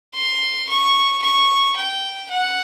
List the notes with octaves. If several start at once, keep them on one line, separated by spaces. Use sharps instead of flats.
C6
C#6
C#6
G5
F#5